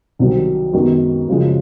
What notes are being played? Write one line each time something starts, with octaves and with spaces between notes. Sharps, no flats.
C2 C3 D#3 F#3
F#2 D#3 G#3 B3
F#2 C#3 F3 G#3